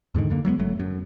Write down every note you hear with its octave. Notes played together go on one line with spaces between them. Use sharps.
E2 G#2 D3 D#3
F#2 D3 A#3
F#3 G#3 A#3 B3
F#1 F#2 F#3 A3
F#2